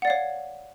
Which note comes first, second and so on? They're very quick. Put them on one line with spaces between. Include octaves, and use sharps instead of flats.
F#5 D5 F5 C#5